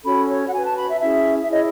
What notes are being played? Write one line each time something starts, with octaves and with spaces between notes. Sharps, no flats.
C#4 F#4 A4 C#5 B5
C#5
F#5
F#4 B4 G#5
A5
B5
E5
C#4 E4 G#4 E5
E5
E4 G#4 C#5 D#5